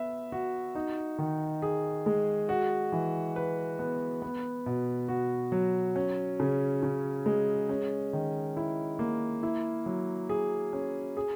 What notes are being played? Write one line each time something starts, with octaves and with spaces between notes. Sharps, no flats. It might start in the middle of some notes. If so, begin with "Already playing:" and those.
Already playing: B3 E5
F#4
D#4
D#3
G#4
G#3
F#4
E3
B4
B3
B3
B2
F#4
F#3
C#4
C#3
C#3
G#3
C#4
D#3
E4
A#3
E4
F#3
G#4
C#4
G#4